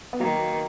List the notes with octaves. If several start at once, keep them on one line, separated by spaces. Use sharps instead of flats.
B3
D#3 F#3 A#3